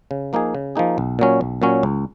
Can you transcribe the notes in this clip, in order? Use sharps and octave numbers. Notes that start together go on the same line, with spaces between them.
C#3
F3 A#3 D#4 G#4
C#3
F3 A#3 D#4 G#4
B1
A#2 F#3 C#4
B1
A#2 F#3 C#4
C#2